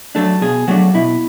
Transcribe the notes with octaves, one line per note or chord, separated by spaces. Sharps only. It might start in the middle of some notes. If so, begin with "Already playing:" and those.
F#3 A3 D4 A4
B2 G#4
F#3 A3 D4 F#4
B2 E4